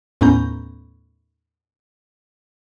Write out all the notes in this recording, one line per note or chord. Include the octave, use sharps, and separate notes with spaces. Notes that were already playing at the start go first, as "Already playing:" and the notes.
D#2 A2 B3 C#4 A#5 G6